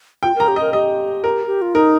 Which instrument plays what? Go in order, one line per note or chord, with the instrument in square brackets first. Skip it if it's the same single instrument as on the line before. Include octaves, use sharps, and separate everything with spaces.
[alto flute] F4 [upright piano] G5
[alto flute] A#4
[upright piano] A#5
[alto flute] G4
[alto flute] A#4 [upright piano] D#5
[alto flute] G4 [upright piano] D#5
[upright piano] A#4
[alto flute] G4
F4
[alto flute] D#4 [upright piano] A#4